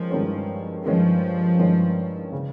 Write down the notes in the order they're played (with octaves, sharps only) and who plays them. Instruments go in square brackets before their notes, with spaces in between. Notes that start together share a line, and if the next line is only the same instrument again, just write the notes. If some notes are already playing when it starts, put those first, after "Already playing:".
Already playing: [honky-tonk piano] D#3 G#3 C#4 [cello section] F3
[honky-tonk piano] G2 D#3 G#3 C#4
[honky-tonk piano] G2 D#3 G#3 C#4 [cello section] F3
[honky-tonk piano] G2 D#3 G#3 C#4
C#3